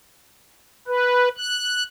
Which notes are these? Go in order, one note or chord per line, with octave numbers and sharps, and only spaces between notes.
B4
F#6